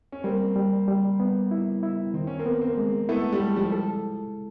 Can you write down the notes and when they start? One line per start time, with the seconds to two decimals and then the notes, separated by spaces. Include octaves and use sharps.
0.12 C#4
0.24 G3 A#3 C4
0.56 G3
0.88 G3
1.20 B3
1.51 E4
1.83 E4
2.14 D#3 C4
2.27 C#4
2.39 A#3 C4
2.46 B3
2.61 A#3 C4
2.78 G#3
3.09 A3 B3 E4
3.32 G3 A3
3.40 G#3
3.56 F3 G3
3.72 A4